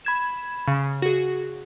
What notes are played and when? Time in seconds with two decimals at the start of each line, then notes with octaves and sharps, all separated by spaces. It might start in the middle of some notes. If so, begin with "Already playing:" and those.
0.05 B5 G#6 E7
0.68 C#3
1.02 F#4 G#4